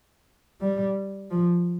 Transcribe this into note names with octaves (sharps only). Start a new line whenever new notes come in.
G3
F3